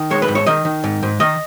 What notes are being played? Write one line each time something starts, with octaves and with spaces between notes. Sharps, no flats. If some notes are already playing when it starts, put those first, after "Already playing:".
Already playing: D#3
G#3 C#5
B4
G#2
C#5
D#3 D#5
D#3
G#2
G#2
D#3 D#5